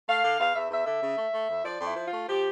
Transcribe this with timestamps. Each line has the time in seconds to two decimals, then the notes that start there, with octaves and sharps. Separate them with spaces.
0.08 A3 F5
0.25 D3
0.40 E2 F5
0.55 E2 E5
0.71 E2 E5
0.86 D3 E5
1.03 C#3
1.18 A3
1.34 A3
1.50 F2
1.65 F3 D5
1.81 F2
1.86 E4
1.96 F3
2.08 A3 F4
2.29 F3 G4